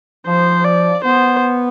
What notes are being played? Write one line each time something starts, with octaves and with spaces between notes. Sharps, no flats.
F3 C5
D5
B3 C5